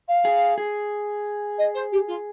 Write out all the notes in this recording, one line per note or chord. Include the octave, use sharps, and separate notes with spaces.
F5
G#4
G#4
D#5
C5
G4
F4